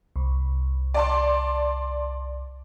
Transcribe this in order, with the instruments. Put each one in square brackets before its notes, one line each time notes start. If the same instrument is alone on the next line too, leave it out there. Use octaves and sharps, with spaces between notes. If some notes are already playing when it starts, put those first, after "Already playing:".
[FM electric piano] C2
[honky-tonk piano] D5 A5 C6